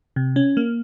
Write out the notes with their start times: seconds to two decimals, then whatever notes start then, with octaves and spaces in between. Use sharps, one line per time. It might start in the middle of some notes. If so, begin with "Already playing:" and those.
0.16 C3
0.36 C#4
0.57 A#3